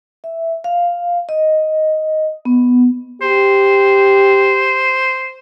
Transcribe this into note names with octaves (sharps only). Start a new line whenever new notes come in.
E5
F5
D#5
B3
G4 C5